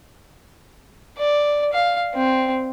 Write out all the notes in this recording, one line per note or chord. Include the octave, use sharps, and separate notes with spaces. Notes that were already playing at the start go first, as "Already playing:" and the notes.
D5
F5
C4